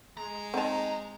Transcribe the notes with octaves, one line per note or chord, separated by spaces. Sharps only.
G#3 A#5
C4 D#4 A5